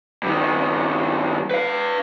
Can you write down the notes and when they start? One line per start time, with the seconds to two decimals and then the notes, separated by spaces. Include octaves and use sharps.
0.23 G2 D#3
1.51 B4 F5